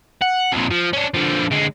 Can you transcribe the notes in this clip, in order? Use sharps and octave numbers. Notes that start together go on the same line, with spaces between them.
F#5
F2 A#2
F3
C#4 D4
D3 F3
D3 G#3